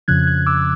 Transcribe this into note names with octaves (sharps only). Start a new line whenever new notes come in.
F2 C#3 F3 F#6 G#6
F#6 G#6
D6 E6